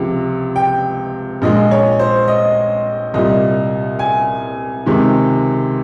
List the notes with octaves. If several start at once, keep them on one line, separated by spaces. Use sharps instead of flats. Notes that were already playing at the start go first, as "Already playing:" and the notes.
Already playing: C#2 C3 F3
G5
A#1 A#2 G#3 D#5
C#5
C5
D#5
C2 A#2 G3 D#5
G#5
C#2 C3 D#3 G#3